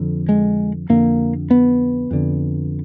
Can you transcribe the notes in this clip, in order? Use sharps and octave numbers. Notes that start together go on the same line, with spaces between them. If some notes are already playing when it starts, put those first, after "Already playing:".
Already playing: F2 D3
G#3
F2 D3 A#3
B3
F2 D3